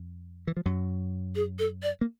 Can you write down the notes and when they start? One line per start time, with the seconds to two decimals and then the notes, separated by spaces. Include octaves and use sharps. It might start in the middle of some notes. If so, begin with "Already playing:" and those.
Already playing: F2
0.47 E3
0.57 F3
0.66 F#2 F#3
1.35 G#4
1.59 A4
1.83 D5
2.01 A#3